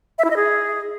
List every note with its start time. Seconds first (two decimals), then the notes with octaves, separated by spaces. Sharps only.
0.18 E5
0.24 E4
0.30 D#5
0.36 G#4